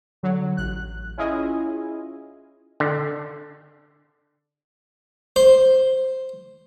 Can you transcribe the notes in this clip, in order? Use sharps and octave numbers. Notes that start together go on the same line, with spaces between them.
D3 F#3
A1 F#6
C#4 E4 F4 G#4 D#5 G#5
D3
C5